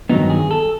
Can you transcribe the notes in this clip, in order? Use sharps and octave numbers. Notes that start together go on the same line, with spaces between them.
G2 D#3 F#3 B3 D#4
G#4
A4